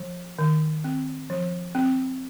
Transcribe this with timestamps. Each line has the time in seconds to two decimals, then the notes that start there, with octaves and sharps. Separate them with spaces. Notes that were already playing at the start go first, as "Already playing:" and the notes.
Already playing: F3
0.39 D#3
0.84 C4
1.30 F3
1.75 C4